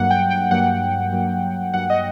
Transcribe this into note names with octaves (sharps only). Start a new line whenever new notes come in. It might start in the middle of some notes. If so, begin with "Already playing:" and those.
Already playing: G2 F#3 A#3 F#5
G5
G5
G2 F#3 A#3 F#5
G2 F#3 A#3
G2 F#3 A#3 F#5
D#5